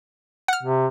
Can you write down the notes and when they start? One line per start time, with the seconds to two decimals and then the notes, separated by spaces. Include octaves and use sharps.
0.48 F#5 F6
0.63 C3